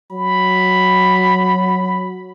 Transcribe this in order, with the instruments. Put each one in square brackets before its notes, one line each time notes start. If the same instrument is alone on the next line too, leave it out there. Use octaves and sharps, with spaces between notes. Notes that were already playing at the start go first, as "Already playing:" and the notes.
[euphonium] F#3 [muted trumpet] B5